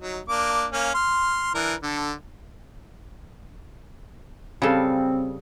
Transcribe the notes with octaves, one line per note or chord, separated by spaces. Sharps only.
F#3 D#4
A#3 D4 D6
A#3 C#4 F5
C6 F6
E3 D4 A#4
D3 A4
C#3 G3 C4 A4 F5